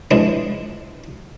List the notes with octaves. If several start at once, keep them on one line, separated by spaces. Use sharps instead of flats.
E3 F3 G#3 D4